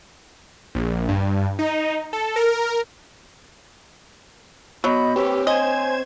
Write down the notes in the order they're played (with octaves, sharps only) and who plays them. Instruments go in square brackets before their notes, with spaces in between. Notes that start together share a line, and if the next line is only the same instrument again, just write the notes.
[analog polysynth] A#1
G2
D#4
A4
A#4
[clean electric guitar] B2 [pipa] F#3 [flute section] D#5 B5 G6
[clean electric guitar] C4 C#5 [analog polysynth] G4 [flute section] B4 E6
[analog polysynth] C5 G#6 E7 [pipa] D#5 [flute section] G#5